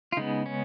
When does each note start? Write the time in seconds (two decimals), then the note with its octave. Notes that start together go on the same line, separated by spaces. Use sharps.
0.12 F4
0.17 C#3 G#3 B3 D#4
0.46 C#4